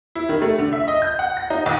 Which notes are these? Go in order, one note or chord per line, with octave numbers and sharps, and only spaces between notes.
E4
D#3
A3
D3
E5
D#5
G6
F#5
A#6
D#4
D#2